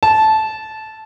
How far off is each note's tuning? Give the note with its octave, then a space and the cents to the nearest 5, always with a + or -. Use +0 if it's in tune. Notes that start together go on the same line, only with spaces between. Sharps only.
A5 -15